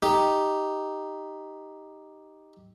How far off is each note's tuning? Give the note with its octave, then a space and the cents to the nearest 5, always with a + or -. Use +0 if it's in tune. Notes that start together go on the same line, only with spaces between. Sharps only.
D#4 +0 G4 +0